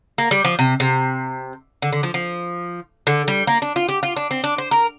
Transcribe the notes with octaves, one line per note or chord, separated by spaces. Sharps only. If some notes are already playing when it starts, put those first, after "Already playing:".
A#3
G3
F3
C3
C3
D3
D3
F3
F3
D3
G3
A#3
D4
F4
G4
F4
D4
C4
D4
C5
A#4